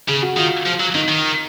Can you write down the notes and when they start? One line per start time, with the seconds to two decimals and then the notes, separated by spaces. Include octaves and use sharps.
0.08 C#3 G#4
0.22 F#4
0.37 D#3 F4
0.66 F3
0.80 F#3
0.94 D#3 D#4
1.08 D#3